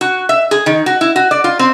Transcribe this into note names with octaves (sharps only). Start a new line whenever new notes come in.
F#4
E5
G#4
D#3
F#4
E4
F#4
D5
F4
C4